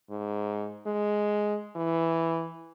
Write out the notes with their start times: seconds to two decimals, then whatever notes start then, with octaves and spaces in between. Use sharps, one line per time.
0.10 G#2
0.86 G#3
1.76 E3